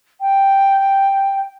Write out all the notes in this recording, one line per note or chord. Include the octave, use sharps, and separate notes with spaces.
G5